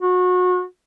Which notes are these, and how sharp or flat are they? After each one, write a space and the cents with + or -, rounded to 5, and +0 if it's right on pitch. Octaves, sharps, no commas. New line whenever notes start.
F#4 -30